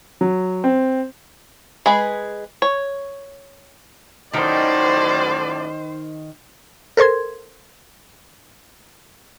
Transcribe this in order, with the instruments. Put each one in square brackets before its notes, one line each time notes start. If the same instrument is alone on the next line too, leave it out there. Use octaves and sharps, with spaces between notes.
[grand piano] F#3
C4
[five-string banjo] G#3 G#4 B4
C#5
[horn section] F#2 A2 D5 [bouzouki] D#3 [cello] C5
[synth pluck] A4 A#4 C5 C6 G#6